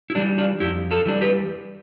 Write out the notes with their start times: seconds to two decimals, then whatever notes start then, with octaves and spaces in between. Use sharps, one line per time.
0.10 E4
0.15 E3 G3 D4
0.38 D4 F4
0.60 F2 E4 G4
0.91 F4 A4
1.06 E3 G3 D4
1.21 G4 B4